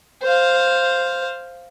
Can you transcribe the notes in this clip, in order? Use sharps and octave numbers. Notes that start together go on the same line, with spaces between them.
C5 F5